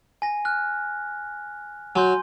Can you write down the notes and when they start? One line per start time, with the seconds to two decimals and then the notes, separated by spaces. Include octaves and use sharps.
0.22 G#5 A#6
0.45 F6 F#6
1.96 F#3 G#5 C6 G6